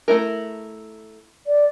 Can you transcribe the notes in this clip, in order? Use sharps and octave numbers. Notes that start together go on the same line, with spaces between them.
A3 E4 A#4
D5